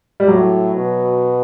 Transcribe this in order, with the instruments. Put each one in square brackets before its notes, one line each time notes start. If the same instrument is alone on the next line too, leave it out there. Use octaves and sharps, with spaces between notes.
[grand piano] G3
[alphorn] A2 [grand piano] F#3
[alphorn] B2